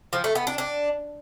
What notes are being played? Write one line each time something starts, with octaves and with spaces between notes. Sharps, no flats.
F3
A3
B3
D4
D4